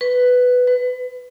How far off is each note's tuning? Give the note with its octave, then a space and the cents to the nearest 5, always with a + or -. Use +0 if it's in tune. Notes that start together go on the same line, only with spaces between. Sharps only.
B4 +5
B4 +30